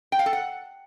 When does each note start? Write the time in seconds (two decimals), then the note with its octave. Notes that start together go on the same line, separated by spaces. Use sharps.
0.12 G5
0.19 F5
0.26 A4
0.33 F#5